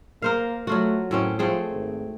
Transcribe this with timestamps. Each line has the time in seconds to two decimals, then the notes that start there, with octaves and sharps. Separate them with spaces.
0.22 A#3 A#4 C5 F5
0.67 F#3 A3 F4 F#4
1.11 F#2 A2 C4 C#4
1.39 F3 A3 C4 G#4
1.72 G#1